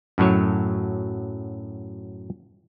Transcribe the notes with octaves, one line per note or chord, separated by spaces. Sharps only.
F#2 A2 F#3 C#5